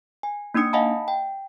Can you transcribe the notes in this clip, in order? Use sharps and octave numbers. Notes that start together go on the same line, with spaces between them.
G#5
A#3 D4 D#4 D#6 C#7
D#5 F5 F#5 G#5 A5 B5
G5